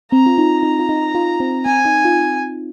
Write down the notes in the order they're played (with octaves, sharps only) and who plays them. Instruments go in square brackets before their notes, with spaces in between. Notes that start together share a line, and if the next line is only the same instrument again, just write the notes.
[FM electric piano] C4 [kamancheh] A#5
[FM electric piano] F4
D#4
D#4
F4
D#4
F4
C4
[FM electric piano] C4 [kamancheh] G#5
[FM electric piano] D#4
F4